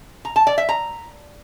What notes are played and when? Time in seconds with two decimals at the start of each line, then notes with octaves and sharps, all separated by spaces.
0.25 A#5
0.36 A5
0.47 D5
0.58 E5
0.69 A#5